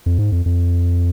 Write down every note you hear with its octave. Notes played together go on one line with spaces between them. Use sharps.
F2
G#2
F2
F2